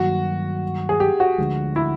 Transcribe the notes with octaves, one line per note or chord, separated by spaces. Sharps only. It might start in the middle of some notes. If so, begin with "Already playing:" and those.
Already playing: G2 D#3 F#3 A#3 F#4
G#4
G4
F#4
D2 D3 F3 G#3
E4